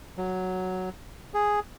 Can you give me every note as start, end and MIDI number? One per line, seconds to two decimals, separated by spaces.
0.18 0.89 54
1.34 1.60 68